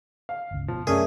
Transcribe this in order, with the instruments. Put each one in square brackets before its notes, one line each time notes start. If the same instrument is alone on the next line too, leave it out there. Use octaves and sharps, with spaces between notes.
[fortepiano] F5
[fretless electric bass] G1 C#2
[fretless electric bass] B2 [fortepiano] F3
[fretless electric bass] F#2 C3 [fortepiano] A3 C#4 [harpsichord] G#4 [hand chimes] A#4 D5 E5